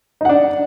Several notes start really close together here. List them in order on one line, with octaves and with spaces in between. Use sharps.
D#4 F#5 D4